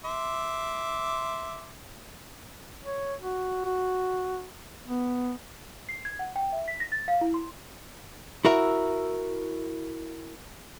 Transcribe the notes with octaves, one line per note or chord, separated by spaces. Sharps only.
E5 C6 D6
C#5
F#4
F#4
B3
C7
G#6
F#5
G5
E5
B6
A#6
A6
F5
E4
C6
E4 F#4 A#4 E5